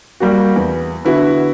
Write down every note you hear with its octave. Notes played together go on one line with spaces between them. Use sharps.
G3 A#3 F#4
E2
D3 B3 E4 F#4